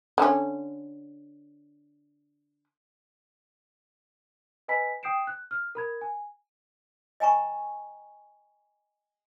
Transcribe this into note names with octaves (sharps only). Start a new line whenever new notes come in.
D3 C#4
B4 D#5 G#5 B5 B6
G5 D#6 G6 C7 D7 E7
F#6
F6
A#4 B5 G#6
G#5
D#5 G5 G#5 A#5 C#6